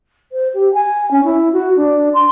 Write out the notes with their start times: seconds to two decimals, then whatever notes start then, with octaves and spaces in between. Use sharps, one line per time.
0.32 C5
0.54 G4
0.74 G#5
1.11 C#4
1.24 E4
1.53 F#4
1.76 D4
2.14 C6